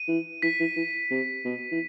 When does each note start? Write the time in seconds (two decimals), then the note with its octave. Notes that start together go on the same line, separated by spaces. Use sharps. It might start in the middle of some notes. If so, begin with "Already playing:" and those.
Already playing: D#7
0.08 E3
0.42 E3 B6
0.60 E3
0.77 E3
1.11 C3
1.45 B2
1.72 E3